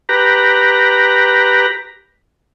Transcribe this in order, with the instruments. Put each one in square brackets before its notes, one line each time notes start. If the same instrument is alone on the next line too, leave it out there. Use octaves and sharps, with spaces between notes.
[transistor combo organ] G4 B4 A#5